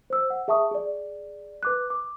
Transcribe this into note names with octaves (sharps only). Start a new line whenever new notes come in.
C5 E6
F#5
G#4 E5 A5 C#6 D#6
G#4 D5
B4 D6 F#6
D6